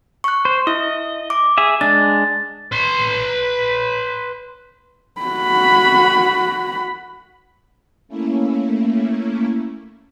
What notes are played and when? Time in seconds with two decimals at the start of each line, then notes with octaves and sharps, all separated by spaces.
0.24 C#6 F#6
0.45 C5
0.67 E4 D#5
1.30 D6
1.58 G#4 E5
1.81 G#3 D4 A6
2.72 B4 C6
5.21 F#4 B5
8.08 A3 A#3 C#4 E4